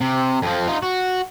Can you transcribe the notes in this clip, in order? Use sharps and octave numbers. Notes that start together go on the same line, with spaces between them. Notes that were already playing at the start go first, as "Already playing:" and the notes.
C3
F2 F3
D#4 F4
F#4